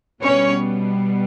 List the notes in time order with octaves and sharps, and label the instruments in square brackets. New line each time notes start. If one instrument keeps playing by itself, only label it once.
[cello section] B2 G3 B3 C#4 C#5